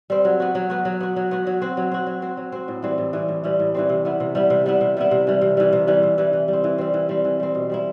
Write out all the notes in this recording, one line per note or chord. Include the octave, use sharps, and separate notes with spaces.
G3 C4
F#3
B3 F#4
F#3
B3 F#4
F#3
B3 F#4
F#3
B3 F#4
F#3
C4 F#4
F#3
C4 F#4
F#3
C4 F#4
F#3
C4 F#4
A2
E3 G3 C4
A2
E3 G3 C4
A2
E3 G3 C4
A2
E3 G3 C4
C3
G3 B3 E4
C3
G3 B3 E4
C3
G3 B3 E4
C3
G3 B3 E4
C3
E3 G3
C3
E3 G3
C3
E3 G3
C3
E3 G3
E3
G3
C4
E3
G3 C4
E3
G3 C4
E3
G3 C4
B2
G3 C4 E4